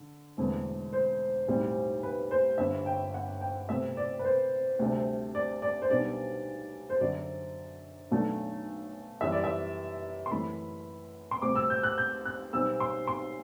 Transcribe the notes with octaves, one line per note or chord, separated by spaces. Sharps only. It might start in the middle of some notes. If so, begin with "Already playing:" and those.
Already playing: D3
E1 E2 D3 A3 C4
C5
B1 A2 G3 C4
B4
C5
G1 G2 D3 E5
G5
F#5
G5
C2 B2 A3 C4 E5
D5
B4
C5
D2 C3 G3 D4
D5
D5
C5
B1 B2 G3 B3 D4 D5
C5
F#2 D3 F#3 D5
B1 B2 F#3 A3 D4
F#2 E3 G3 E5
D5
E5
C6
F#2 E3 A3 B5
C6
D2 C3 G3 C4 D6
E6
G6
F#6
G6
F#6
B1 B2 G3 C4 E6
C6
C6